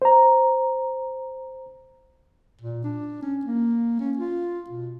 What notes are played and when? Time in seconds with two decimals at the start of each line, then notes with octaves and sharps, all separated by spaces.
0.02 C5 A#5
2.61 A#2
2.84 D4
3.22 C#4
3.45 A#3
4.00 C#4
4.17 F4
4.70 B2